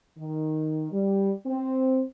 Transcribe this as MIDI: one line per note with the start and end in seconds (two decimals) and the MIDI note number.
0.18 0.87 51
0.92 1.32 55
1.47 2.03 60